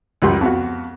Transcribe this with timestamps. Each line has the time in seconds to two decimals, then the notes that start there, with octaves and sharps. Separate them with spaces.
0.22 C#2 F#2 G3 C6
0.41 F2 B3 F#4